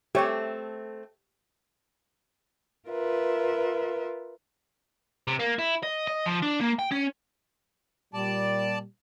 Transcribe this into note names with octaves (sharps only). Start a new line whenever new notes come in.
A3 C4 G4 C#5
F4 A#4 B4 E5
C3
A#3
E4
D#5
D#5
F3
D4
A#3
G5
C#4
A#2 G3 D5 A5